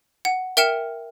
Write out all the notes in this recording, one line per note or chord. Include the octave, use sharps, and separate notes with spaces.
F#5
A#4 E5 G5 F6 C#7 E7